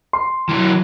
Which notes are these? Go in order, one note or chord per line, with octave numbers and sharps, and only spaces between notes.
C6
E3 F#3